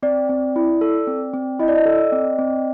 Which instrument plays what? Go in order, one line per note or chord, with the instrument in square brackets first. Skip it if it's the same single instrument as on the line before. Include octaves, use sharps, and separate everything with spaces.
[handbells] C4 [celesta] D5
[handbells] C4
E4
A4
C4
C4
[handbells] E4 [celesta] D#5
[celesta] D5
D#5
[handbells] A4
C4
C4